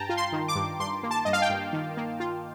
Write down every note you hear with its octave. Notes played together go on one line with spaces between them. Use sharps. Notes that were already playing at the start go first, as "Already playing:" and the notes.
Already playing: G2 G5 A5 A#5
F4
C6
D#3
D6
G2
G2 C6
A#3
A5
G2 D#5
F5
G5
G2
D#3
A#3
F4